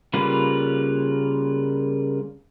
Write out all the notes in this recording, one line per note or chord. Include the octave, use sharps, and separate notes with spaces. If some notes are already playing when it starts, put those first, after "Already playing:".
C#3 G3 A#3 F4 B4